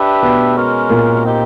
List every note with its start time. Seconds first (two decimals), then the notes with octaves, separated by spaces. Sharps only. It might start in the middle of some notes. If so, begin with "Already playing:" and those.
Already playing: D4 G4 B4 E5
0.22 B2 B3
0.56 G#3 C#4 F#4 A#4
0.90 A#2 A#3
1.24 C4 D#4 G4